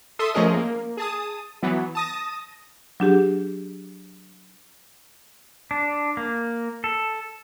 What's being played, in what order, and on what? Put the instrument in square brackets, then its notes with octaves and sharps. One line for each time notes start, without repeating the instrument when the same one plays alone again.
[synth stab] A4 E5 C6 D#6
F3 A3 C#4 G#4 A#4 D#5
A#3
G#4 A5 D#6
E3 F#3 B3
A5 D#6 A#6
[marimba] F#3 D4 G4 G#4
[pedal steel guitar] D4
A#3
A4